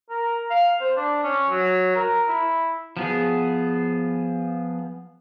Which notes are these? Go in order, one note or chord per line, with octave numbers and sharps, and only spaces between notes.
A#4
F5
C5
D4
C#4
F#3
A#4
E4
F3 B3 G#4